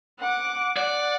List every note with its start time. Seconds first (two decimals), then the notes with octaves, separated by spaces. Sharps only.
0.19 F#5 D6
0.77 D5 F#5